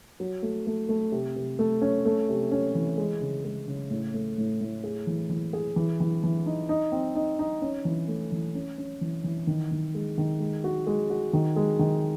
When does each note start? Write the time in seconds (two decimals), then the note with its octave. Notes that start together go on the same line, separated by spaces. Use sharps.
0.20 F#3
0.42 A3
0.67 A3
0.89 A3
1.12 C3
1.36 C3
1.59 A3
1.82 C#4
2.05 A3
2.29 C3
2.52 C#4
2.75 E3
2.98 G#3
3.21 C#3
3.45 G#3
3.68 C#3
3.90 A2
4.14 A3
4.38 A2
4.61 A2
4.84 G#4
5.07 E3
5.29 E3
5.53 G#4
5.76 E3
6.00 E3
6.23 E3
6.46 D#4
6.69 D#4
6.92 C4
7.15 D#4
7.39 D#4
7.62 C#4
7.85 E3
8.08 A3
8.32 E3
8.55 C#4
8.78 C#4
9.01 E3
9.24 E3
9.47 D#3
9.71 D#3
9.95 G#3
10.18 D#3
10.40 G#3
10.64 F#4
10.87 G#3
11.10 F#4
11.33 D#3
11.56 G#3
11.79 D#3